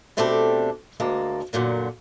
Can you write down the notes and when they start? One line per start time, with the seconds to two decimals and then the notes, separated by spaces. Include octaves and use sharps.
0.17 B2 A3 C4 D4 G4 A4
1.00 D2 G#3 A#3 A5
1.53 F#2 A#2 D3 F#3